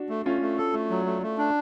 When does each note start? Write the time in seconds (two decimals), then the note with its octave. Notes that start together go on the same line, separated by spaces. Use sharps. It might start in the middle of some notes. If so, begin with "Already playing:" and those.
Already playing: D4 F#4
0.09 A3
0.26 A3 C#4 F4
0.41 A3
0.58 A4
0.73 A3
0.90 F#3
1.05 A3
1.22 A3
1.38 D4